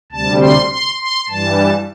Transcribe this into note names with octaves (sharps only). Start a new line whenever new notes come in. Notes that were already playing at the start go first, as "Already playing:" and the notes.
D2 C3 G3 A5
C6
C6
C6
G2 E3 G3 A5